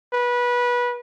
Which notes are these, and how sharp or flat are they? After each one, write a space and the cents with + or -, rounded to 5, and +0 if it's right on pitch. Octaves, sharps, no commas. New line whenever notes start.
B4 -20